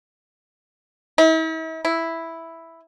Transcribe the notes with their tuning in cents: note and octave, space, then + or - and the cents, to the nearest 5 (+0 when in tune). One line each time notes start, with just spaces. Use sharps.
E4 -45
E4 +0